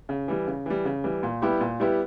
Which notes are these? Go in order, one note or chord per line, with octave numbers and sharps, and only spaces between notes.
C#3
E3 G3
C#3
E3 G3
C#3
E3 G3
A#2
G3 B3 E4 G4
A#2
G3 B3 E4 G4